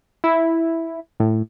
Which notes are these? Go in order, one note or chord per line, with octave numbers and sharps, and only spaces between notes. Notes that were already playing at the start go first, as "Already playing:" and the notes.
E4
A2